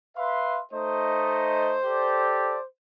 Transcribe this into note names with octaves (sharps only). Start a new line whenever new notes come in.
B4 E5 F5 C6
A3 D#4 C5 D#5
G4 A4 D5